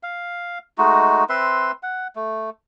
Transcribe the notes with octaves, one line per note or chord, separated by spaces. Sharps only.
F5
G#3 A3 D#4 F#4
C4 B4 E5 C6
F#5
A3